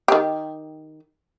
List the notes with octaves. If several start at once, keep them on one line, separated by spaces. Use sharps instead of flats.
D#3 G4